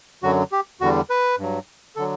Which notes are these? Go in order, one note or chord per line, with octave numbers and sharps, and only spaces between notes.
F#2 D3 F#3 F#4
G4
E2 D3 G3 F#4
B4
G2 F#3
D3 F#3 A4